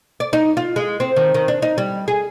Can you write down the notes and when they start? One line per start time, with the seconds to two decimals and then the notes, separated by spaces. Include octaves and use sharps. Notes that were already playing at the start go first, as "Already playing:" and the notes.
0.20 D5
0.33 D#4
0.57 F4
0.76 G#3
1.00 C4
1.16 D#3
1.34 D#3
1.48 D4
1.62 D#4
1.78 G3
2.08 G#4